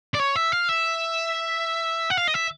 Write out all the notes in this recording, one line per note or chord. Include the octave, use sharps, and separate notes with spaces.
D5
C#5
E5
F5
E5
F#5
F5
D#5
E5